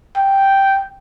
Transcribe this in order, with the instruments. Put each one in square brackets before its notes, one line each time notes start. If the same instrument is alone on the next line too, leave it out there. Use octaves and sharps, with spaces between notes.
[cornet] G5